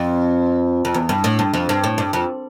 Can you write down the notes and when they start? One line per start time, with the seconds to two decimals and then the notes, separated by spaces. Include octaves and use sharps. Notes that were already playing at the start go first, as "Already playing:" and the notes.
Already playing: F2
0.85 F2
0.94 E2
1.09 G2
1.24 A2
1.39 G2
1.54 F2
1.69 G2
1.84 A2
1.98 G2
2.13 F2